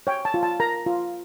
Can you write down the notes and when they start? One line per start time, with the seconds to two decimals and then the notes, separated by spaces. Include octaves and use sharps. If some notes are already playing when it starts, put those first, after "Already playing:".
0.07 C#5 G5
0.25 A5
0.34 F4
0.43 A5
0.60 A#4 A#5
0.86 F4